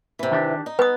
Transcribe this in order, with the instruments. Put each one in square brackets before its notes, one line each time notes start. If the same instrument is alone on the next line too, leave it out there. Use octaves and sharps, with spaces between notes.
[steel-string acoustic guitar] C3 E3
[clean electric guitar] D#3 D4 G4
[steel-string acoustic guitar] D#4
[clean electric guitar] B3 [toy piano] B4 D#6